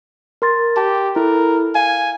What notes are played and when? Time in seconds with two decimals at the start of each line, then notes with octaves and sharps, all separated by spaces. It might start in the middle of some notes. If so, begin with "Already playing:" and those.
0.42 A#4 C6 A6
0.77 G4 A5
1.16 E4 A4 A#4
1.75 F5 G#5